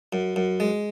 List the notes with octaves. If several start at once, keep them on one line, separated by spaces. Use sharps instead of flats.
F#2
F#2
G#3